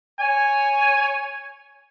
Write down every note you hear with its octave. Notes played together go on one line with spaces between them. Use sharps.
C#5 G#5